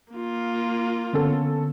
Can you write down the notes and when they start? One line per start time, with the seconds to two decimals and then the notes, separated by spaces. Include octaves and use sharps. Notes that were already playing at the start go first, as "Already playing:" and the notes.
0.13 A#3 F4
1.13 D3 B3 C#4 A4